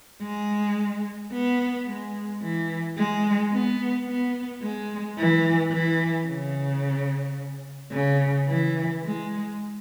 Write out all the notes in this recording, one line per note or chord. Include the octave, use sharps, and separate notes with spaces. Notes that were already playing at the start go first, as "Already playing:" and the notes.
G#3
B3
G#3
E3
G#3
B3
B3
G#3
E3
E3
C#3
C#3
E3
G#3